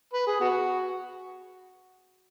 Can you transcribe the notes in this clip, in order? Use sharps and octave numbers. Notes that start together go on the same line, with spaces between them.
B4
G#4
B3 F#4